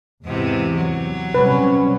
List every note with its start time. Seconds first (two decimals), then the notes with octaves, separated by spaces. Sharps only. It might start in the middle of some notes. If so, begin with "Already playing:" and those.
0.24 E2 G#2 C3 E3
0.75 F#3
1.35 C3 G3 C#4 B4